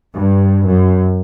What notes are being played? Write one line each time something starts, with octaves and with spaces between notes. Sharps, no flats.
G2
F#2